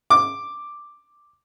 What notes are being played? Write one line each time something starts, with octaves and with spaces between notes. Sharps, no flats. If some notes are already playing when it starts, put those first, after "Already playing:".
D6